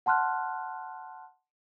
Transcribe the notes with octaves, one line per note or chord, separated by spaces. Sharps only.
F#5 A5 C6 F6 F#6